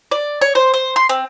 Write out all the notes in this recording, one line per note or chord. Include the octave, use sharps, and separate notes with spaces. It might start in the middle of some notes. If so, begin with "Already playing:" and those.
D5
C#5
C5
C5
C6
C4